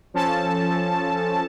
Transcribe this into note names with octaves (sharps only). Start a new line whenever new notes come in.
F3 C#4 A4 A5